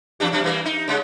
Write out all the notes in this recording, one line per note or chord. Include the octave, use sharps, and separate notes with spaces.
E2 D4 G4
C3 G3 D4
E3 G3 A#3
D#4
C#3 G#3